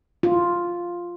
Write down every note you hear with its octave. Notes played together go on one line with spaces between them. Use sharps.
F4